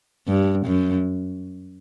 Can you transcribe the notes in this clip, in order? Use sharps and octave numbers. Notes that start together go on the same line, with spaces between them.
G2
F#2